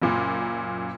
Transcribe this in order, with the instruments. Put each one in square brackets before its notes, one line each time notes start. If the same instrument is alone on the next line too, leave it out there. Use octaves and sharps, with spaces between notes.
[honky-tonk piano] F#1 F#2 A#2